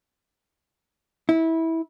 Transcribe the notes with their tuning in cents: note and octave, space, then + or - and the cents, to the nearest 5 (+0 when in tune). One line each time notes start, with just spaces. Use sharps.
E4 -20